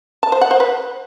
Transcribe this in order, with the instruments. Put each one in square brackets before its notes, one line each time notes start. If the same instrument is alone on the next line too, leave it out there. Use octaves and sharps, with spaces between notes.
[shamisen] A5
C5
F#5
C5
B4